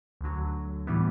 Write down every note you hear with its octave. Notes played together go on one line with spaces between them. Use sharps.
D2 D3 F#3
A2 E3 G3 B3 E4